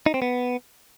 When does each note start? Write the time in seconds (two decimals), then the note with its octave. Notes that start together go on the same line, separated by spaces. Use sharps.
0.06 D#4
0.14 C4
0.22 B3